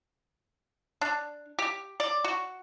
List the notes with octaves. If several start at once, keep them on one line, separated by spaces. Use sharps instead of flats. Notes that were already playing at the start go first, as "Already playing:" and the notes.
D4
G4
D5
F#4